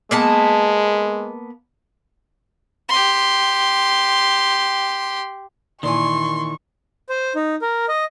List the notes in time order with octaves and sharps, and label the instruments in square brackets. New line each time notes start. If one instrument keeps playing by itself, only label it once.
[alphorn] G#3 [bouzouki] A#3 B3 A5
[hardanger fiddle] G4 C6
[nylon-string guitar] A#2 E3 G#5 [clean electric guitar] D#3 [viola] C6 [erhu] C#6
[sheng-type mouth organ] C5
D#4
A#4
D#5